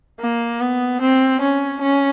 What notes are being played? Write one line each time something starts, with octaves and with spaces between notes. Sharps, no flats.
A#3
B3
C4
C#4
C#4